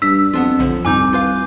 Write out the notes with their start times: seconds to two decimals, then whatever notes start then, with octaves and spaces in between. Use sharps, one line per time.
0.02 G2 E6 B6
0.33 F2 B3 D4 F4
0.59 B1 D3 F3
0.85 C2 F2 G#2 D#4 G#5 D6 G6
1.13 F4 B4 F5